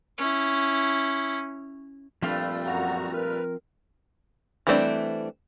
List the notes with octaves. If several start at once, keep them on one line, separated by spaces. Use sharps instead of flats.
C#4 E4
G2 A#2 F3 A3 C4 F5
F#2 F#4 F#5 A#5
A#4 B4 F6
E3 G3 A3 C4 D4